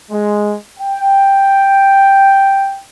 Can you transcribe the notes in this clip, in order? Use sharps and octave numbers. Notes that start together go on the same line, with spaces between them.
G#3
G5